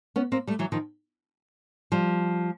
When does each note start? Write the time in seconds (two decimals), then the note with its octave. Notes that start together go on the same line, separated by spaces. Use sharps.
0.16 B3 C#4
0.32 A#3 C4
0.47 G3 A3
0.59 E3 F#3
0.72 D#3 F3
1.92 F3 G3